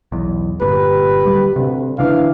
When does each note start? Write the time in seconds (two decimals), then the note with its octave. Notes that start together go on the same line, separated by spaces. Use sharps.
0.12 B1 E2
0.61 G1 A#2 G4 B4
1.25 D1 G3
1.56 D2 C3
1.99 D2 C#3 E3 D4 F5